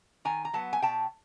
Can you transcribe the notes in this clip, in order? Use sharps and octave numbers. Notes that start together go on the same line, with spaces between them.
D#3 G#5 A#5
A#5
F#3 B3 A5
G#5
B2 G5 A5